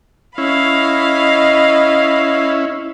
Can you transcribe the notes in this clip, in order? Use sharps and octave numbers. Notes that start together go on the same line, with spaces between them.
C#4 E4 D#5 F5 B5